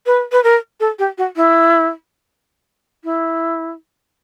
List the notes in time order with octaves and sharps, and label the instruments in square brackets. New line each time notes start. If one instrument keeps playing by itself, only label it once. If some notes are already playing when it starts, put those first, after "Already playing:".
[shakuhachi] B4
B4
A#4
A4
G4
F#4
E4
E4